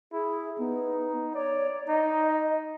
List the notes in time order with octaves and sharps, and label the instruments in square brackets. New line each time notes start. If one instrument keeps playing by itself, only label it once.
[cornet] E4 [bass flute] G#4
[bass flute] B3 [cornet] D#4
[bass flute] C#5 [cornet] D5
[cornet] D#4 [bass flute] D#5